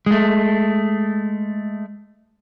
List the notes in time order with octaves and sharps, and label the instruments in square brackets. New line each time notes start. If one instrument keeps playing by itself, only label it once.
[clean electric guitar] G#3 A3